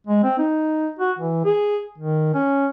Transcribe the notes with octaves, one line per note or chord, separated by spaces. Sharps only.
G#3
C4
D#4
F#4
E3
G#4
D#3
C#4